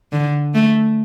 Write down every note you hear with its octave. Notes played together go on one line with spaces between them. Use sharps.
D3
A3